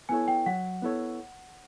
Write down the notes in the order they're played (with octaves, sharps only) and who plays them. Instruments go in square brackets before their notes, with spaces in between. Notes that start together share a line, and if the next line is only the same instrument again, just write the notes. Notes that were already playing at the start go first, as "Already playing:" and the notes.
[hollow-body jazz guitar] B3 E4 A4 C#5 [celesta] G#5
[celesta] G5
[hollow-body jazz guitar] F#3 [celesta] F#5
[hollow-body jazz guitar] B3 E4 A4 C#5